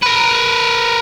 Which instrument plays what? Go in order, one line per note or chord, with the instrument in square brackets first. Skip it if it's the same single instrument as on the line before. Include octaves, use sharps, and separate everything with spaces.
[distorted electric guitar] A#4 B4